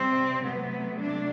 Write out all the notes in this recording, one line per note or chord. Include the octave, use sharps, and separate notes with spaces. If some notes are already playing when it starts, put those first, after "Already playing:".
Already playing: C3 G3 C4
C3 F#3 A3 B3
D4